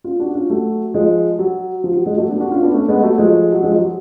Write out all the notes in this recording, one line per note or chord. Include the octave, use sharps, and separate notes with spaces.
C#4 F4
D4 F#4
C#4 F4
F#3 A3
F3 G#3
F#3
F3
F#3
F3 G#3
F#3 A3
B3 D4
D4 F#4
C#4 F4
B3 D4
A3 C#4
G#3 B3
F#3 A3
F3 G#3
F#3
F3 G#3
F#3